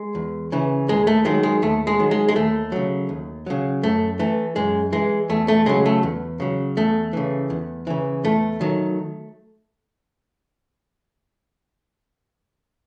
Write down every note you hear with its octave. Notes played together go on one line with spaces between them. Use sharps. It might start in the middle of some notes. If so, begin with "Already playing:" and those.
Already playing: G#3
E2
C#3 E3
D#2 G#3
A3
D#3 F#3 G#3
G#3
D#2 A3
G#3
D#3 F#3
G#3
G#3
D#2 A3
C#3 F#3
D#2
C#3 F#3
F#2 A3
E3 A3
F#2 G#3
E3 G#3
E2 A3
A3
C#3 F#3 G#3
A3
E2
C#3 F#3
E2 A3
C#3 E3
E2
C#3 E3
E2 A3
D#3 F#3